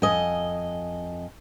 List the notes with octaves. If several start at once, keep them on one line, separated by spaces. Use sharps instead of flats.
F2 D#5 G#5